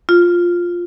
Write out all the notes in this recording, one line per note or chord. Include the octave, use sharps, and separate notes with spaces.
F4